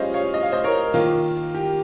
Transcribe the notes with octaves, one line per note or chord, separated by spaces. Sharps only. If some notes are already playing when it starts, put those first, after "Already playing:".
Already playing: G3 C#4 F4 G#4 C5 D#5
C#5 F5
D#5
F5
C5 D#5
A#4 C#5
D#3 A#3 F4
G4